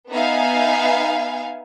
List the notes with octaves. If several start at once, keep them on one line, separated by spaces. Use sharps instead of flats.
B3 D#4 E5 F5 G#5